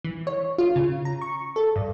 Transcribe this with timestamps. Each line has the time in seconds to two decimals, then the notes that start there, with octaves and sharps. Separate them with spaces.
0.04 E3
0.27 C#5
0.58 F4
0.76 C#3
1.05 A#5
1.22 C#6
1.56 A4
1.76 G2